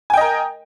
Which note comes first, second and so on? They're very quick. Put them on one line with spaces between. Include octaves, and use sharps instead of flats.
G#5 G5 D#5 A#4